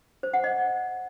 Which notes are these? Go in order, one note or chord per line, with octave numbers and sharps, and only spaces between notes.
C5
F#5
D#5